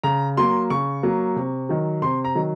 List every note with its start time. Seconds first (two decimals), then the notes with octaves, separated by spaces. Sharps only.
0.04 C#3 A#5
0.37 F#3 A#3 C6
0.70 C#3 C#6
1.03 F#3 A#3
1.36 C3
1.69 D#3 F#3
2.02 C3 C6
2.25 A#5
2.35 D#3 F#3